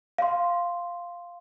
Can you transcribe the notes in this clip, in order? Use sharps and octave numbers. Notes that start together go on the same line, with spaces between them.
F5 C6